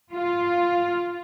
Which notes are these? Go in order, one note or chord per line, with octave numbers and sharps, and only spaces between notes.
F4